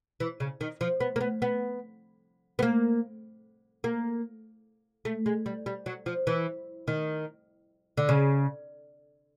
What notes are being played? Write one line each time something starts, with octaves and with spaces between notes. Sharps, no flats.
E3
C#3
D#3
F3
B3
A#3
B3
B3
B3
A#3
A#3
A3
G#3
G3
G3
F#3
F3
E3
D#3
D3
C#3